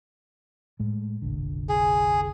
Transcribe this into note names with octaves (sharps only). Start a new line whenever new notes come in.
A2 G#3
F1 A#1 D3
G#4